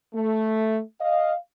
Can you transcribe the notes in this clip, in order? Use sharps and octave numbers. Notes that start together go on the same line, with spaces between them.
A3
D#5 F5